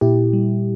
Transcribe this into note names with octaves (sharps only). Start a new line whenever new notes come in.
A#2 E4 G4
G3